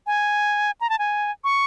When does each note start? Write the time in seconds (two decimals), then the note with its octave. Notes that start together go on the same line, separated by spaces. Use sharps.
0.07 G#5
0.81 A#5
0.90 A5
0.99 G#5
1.44 C#6